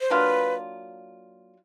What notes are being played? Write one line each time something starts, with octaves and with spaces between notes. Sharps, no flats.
C5
F#3 A#3 D4 F4 B4